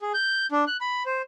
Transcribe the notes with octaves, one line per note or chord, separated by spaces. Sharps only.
G#4
G6
D4
F#6
B5
C5